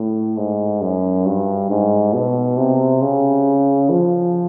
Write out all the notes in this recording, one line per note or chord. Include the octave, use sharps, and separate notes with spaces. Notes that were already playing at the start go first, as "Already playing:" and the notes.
Already playing: A2
G#2
F#2
G2
G#2
B2
C3
C#3
F3